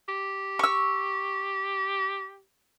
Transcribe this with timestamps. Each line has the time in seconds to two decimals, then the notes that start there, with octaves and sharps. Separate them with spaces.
0.08 G4
0.59 C#6 E6